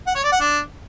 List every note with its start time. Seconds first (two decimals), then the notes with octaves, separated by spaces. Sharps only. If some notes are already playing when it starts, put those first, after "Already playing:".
0.07 F#5
0.15 C#5
0.24 D5
0.32 F#5
0.41 D4